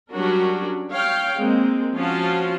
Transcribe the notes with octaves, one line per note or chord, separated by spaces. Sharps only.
F#3 G3 C#4 D4 F#4 A#4
C#5 F5 G5
G#3 A#3 C4
F3 C#4 F4 F#4 F5 A5